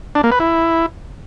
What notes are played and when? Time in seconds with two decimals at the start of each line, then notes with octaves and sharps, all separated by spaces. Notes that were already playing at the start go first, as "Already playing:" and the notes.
0.15 D4
0.23 A#3
0.32 B4
0.40 E4